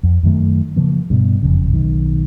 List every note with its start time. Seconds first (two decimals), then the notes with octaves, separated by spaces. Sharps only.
0.03 F2
0.23 F#2 D#3 A3
0.76 C#3 F3 A#3
1.10 G2 B2
1.43 F#1 F2 C#3
1.70 B1 D#3